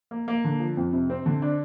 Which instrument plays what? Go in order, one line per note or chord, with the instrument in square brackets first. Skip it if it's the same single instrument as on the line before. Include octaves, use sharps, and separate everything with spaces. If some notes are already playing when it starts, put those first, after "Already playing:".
[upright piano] A#3
A#3
D3
F3
F2
C3
C4
D3
D4